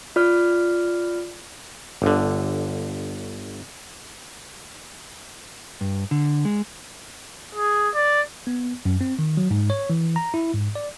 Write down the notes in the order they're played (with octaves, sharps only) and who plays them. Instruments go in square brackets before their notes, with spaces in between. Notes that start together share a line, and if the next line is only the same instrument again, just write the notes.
[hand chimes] F4 D5 F6
[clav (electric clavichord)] G1 D3
[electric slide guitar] G2
D3
G#3
[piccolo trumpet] G#4
D5
[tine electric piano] B3
F#2
C4
D#3
F#3
G#2
C#5
E3
A#5
E4
G#2
D5